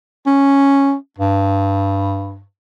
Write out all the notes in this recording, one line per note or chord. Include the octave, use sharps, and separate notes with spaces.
C#4
G2